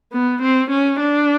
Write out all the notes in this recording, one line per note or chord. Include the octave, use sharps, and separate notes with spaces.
B3
C4
C#4
D4